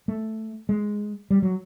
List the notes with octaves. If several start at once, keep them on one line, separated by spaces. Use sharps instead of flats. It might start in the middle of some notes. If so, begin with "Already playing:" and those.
A3
G#3
G3
F#3